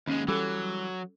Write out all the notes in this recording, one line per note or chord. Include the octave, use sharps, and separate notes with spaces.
D#2 G#3 C#4
E3 F#3 G3 A4